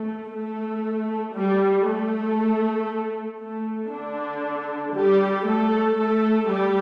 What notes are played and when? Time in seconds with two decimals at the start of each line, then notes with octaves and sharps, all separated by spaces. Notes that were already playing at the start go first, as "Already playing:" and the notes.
Already playing: A3
0.31 A3
1.34 G3
1.85 A3
3.39 A3
3.91 D3 D4
4.94 G3 G4
5.45 A3 A4
5.97 A3 A4
6.47 G3 G4